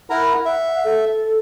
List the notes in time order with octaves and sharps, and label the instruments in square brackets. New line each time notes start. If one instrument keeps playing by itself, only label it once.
[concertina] E4 A#4 A#5 [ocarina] F#5
[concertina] E5 [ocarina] F#5
[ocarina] A4